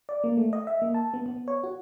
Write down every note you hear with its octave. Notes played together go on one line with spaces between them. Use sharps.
D5
A#3
A3
D#5
E5
A#3
A5
B3
B3
C#5
F#4